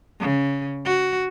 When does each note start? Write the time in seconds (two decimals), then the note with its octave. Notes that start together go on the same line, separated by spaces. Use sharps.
0.20 C#3
0.86 F#4